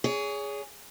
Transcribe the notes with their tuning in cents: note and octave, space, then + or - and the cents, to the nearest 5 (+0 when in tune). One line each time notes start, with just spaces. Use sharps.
G#4 -5 C#5 +30